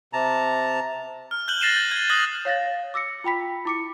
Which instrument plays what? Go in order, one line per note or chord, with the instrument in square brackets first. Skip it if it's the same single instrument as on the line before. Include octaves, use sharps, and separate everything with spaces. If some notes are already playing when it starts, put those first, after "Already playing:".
[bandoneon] C3 A5 A#5
[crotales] F6
F#6 G6 F#7 G7
A6 A#6 C7 D#7 E7 G7
G6
G#6
D#6 F#6 G#6 A#6 F#7
[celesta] C#5 F5 A6 A#6
D6 E6 A#6 C#7
F4 G5 B5 B6
E4 D6 C#7